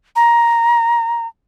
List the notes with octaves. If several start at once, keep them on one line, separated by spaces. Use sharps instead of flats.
A#5